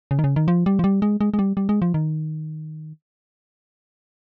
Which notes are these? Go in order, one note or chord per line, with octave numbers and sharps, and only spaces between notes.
C#3
D#3
C#3
D#3
F3
G3
F3
G3
G#3
G#3
G#3
G3
G3
G#3
F3
D#3